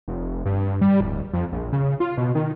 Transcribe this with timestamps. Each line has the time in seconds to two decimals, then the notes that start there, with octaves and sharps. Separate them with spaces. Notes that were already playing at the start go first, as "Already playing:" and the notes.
0.08 F1
0.46 G2
0.81 G3
1.01 D1
1.33 F2
1.52 A#1
1.73 C#3
2.00 F4
2.18 B2
2.35 D#3